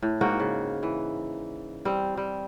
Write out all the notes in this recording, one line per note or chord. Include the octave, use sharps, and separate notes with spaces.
A2
G#2 A#3 F#4 G5
C#3
E3
G3 C4
G3